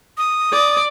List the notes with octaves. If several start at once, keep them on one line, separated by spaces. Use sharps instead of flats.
D#6
D5